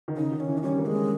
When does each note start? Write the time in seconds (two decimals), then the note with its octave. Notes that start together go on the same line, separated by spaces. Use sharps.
0.08 D#3
0.16 C#3 D#4
0.32 D#3
0.40 C#4
0.48 E3
0.58 D#4
0.63 G3 C#4
0.78 A#3
0.86 G#3
0.94 C#4